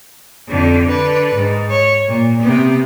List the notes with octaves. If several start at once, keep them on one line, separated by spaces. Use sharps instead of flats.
F2 D3
D3 B4
G#2
C#5
A#2
C3 B3